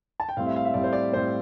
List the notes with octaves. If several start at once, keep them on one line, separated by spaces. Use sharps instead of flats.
A5
G5
A2 G3 C4 F5
E5
F5
E5
A2 G3 C4 D5
C5
D5
A2 G3 C4 C5